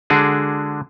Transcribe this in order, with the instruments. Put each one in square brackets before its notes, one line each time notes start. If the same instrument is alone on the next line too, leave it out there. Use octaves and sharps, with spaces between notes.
[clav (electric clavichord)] D3 G#3 D4 F#4 G#4